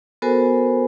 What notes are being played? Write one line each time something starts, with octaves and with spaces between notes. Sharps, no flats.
B3 F#4 A4 A#4 C5 G#5